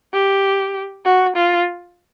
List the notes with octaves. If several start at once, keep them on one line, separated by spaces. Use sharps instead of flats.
G4
F#4
F4